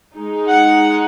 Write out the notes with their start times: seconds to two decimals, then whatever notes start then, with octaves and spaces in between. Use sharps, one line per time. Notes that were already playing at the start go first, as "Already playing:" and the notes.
0.15 G#3 D#4
0.49 F#5